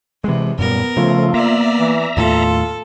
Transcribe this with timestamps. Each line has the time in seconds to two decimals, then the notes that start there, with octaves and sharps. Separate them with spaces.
0.24 C3 E3 G#3
0.59 F#2 A#2 G3 B3 A#4
0.97 C#3 F3 A3 F4
1.34 A#3 B3 D5 E5 A#5
1.79 E3
2.17 D#2 A2 A3 F4 A4